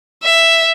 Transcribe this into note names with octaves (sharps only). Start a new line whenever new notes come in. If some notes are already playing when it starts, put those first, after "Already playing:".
E5